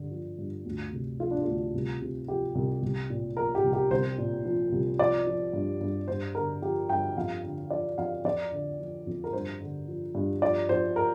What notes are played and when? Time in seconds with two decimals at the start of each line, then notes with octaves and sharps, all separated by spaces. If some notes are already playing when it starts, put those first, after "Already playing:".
Already playing: G2 D3
0.11 F3
0.38 G2
0.66 D2
0.92 C3
1.20 F3 F4
1.31 D4
1.42 D2 F4
1.74 C2
2.01 C3
2.28 F3 G4
2.55 C2
2.82 C2
3.10 A#2
3.37 F3 A#4
3.55 G4
3.64 C2
3.73 G4
3.91 C2 C5
4.18 A#2
4.45 F3
4.72 C2
4.99 F3 D5
5.27 F3
5.53 G2
5.81 G2
6.08 G2 C5
6.35 D3 A#4
6.62 F3 G4
6.89 G2 G5
7.17 F2 F5
7.44 D3
7.70 F3 D5
7.98 F2 F5
8.24 F2 D5
8.52 D3
8.80 F3
9.07 F2
9.24 A#4
9.33 G2 C5
9.61 D3
9.88 F3
10.15 G2
10.42 F3 D5
10.69 F3 C5
10.96 A#4